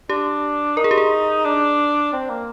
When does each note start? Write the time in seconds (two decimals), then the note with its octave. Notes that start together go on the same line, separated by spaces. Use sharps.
0.10 D4 G4
0.76 D#4 A#4
0.84 G#4
0.91 G4
0.98 G#4
1.45 D4
2.13 C4
2.30 A#3